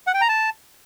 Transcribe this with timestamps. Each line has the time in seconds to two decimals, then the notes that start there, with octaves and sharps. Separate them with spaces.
0.07 F#5
0.14 G5
0.21 A#5
0.29 A5